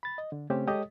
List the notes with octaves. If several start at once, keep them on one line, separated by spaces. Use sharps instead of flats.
B5 A6
D#5
D3
C#3 A3 C4 C#4 G4 C5
G#3 G4 A4 C#5 D#5 D#6